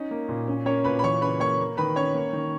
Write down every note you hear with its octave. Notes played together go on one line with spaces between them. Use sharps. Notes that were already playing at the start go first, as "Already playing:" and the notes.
Already playing: C#4 D#4
A#3
A#2
C#4
A#3 C#4 C#5
A#2 B4 B5
B5
E3 C#5 C#6
C#3 B4 B5
A#3 C#5 C#6
A#3
D#3 B4 B5
C#4 C#5 C#6
A#3
D#3